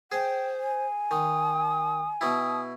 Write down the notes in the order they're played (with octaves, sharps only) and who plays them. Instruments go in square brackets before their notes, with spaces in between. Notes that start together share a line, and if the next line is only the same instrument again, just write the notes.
[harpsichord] G#4 [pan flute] C5 [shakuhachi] G5
[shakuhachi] G#5
[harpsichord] D#3 [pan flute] D#6
[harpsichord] B2 E4 [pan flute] D#6